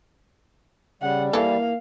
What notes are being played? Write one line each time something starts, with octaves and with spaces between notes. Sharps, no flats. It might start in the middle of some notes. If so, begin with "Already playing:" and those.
C#3 G3 F#5
E3 A#3 A4 F5